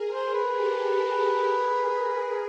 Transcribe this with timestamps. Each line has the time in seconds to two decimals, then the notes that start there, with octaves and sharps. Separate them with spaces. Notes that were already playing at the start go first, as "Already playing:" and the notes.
Already playing: G#4 A#4
0.11 G#4 A#4 C5
0.34 B4
0.55 G4 A4
1.00 G#4 A#4
1.45 G#4 A#4